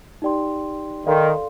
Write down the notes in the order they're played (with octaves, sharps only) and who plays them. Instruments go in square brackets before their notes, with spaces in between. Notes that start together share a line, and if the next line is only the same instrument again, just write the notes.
[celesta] D#4 G4 D5 G5 C6
[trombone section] D#3 [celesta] A4 D5 F5 C6